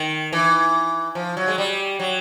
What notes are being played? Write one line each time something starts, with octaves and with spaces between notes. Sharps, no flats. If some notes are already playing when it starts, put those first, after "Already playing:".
Already playing: D#3
E3
F3
F#3
G#3
G3
F#3